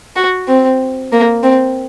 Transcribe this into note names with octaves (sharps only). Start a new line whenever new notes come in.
F#4
C4
A#3
C4